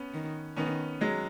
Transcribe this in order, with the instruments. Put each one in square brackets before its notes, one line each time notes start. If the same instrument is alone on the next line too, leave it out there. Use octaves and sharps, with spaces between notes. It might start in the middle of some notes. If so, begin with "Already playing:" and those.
Already playing: [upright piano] B3 C#4
[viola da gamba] D#3
[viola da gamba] D#3 [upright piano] B3 C#4
[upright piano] F#3 G#3